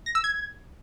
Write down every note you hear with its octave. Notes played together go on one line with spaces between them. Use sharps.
A#6
E6
G#6